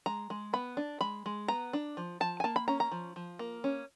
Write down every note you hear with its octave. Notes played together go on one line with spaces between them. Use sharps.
G#3 A#5
G#3
B3 B5
D4
G#3 B5
G#3
B3 A#5
D4
F3
F3 A5
G#5
A#3 A5
B5
C#4 A#5
A#5
F3
F3
A#3
C#4